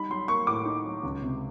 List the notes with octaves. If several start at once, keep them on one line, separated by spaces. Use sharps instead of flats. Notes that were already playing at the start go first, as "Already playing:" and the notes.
Already playing: G3 D#4 B5
F#3 C6
A#3 C#6
A2 D6
D#4
F#3
C#2
C3